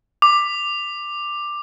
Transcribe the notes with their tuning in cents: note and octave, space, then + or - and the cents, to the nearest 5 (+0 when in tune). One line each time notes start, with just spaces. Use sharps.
D6 +10